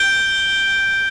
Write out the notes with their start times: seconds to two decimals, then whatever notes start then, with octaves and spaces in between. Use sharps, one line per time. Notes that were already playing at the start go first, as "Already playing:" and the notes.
Already playing: G6 D7 G7